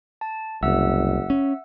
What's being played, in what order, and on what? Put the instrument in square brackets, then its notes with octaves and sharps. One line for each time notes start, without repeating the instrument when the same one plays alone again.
[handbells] A5
[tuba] F#1 [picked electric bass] C2 [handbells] E5 F#5 E6
[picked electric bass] C#4